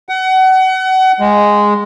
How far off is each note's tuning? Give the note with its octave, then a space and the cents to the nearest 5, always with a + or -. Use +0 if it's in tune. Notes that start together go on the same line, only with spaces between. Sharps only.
F#5 +30
G#3 -5